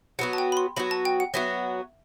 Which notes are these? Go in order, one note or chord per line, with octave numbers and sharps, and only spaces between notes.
F#3 B3 F#4 F#5
A5
G5
B5
C6
F#3 B3 F#4 B5
A5
G5
F#5
F#3 B3 F#4 E5